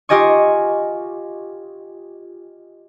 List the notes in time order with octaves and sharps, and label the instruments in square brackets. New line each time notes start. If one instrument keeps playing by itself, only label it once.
[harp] F4 G4 D#5 G#5 C#6